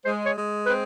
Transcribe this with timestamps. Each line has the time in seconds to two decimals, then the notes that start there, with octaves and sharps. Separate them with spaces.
0.05 G#3 C5
0.25 C#5
0.36 G#3
0.66 C4 B4